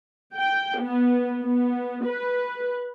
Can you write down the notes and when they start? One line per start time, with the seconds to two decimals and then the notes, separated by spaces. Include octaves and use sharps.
0.36 G5
0.80 B3
1.43 B3
2.05 B4